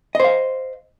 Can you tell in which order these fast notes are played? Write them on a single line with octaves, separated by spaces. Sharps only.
D#5 C5 F5